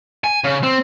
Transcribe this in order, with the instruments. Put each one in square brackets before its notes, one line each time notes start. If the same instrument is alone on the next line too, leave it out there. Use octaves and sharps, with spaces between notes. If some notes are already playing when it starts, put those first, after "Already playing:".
[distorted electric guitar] G#5
C#3
C4